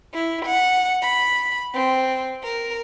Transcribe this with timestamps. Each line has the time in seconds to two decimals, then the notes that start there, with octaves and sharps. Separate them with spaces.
0.13 E4
0.45 F#5
1.02 B5
1.74 C4
2.43 A#4